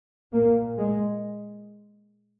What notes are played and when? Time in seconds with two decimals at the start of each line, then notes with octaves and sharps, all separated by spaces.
0.32 A#2 A#3
0.78 G#3